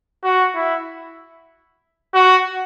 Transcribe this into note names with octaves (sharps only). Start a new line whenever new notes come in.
F#4
E4
F#4